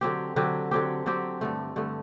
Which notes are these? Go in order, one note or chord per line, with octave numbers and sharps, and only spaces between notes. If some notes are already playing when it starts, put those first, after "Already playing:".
D3 F#3 C4 G4
D3 F#3 C4 G4
D3 F#3 C4 G4
D3 F#3 C4 G4
G2 D3 A3
G2 D3 A3